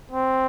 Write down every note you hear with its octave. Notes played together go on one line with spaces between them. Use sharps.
C4